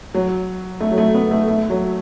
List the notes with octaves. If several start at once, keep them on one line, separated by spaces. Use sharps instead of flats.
F#3
A3
F#3
A3
B3
A3
A3
F#3